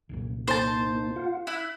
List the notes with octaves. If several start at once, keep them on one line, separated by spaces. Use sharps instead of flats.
C2 F#2 A#2
A#3 D#4 C5 A5
F4 F5 F#5
E4 F#6